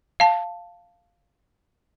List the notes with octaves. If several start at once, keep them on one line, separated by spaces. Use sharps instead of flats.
F5 A5